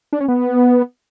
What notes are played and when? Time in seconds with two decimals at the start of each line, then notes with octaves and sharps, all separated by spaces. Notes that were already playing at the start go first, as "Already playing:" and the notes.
0.13 D4
0.20 C#4
0.28 B3